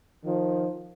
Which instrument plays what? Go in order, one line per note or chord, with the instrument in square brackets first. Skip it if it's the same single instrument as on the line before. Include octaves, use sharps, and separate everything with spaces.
[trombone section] D#3 F3